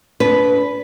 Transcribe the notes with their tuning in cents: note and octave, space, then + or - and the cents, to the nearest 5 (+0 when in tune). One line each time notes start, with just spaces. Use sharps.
D4 -35 B4 +0